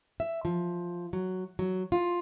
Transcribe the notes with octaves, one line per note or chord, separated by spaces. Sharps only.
E5
F3
F#3
F#3
F4